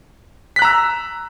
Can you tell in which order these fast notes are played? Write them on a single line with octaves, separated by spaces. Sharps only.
B6 F#6 A#5 E6